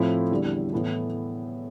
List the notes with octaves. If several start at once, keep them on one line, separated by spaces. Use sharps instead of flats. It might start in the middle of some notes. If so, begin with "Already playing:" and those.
Already playing: A2 F3 A3 C4 E4
E2 D3 G3
A2 E3 B3 E4 A4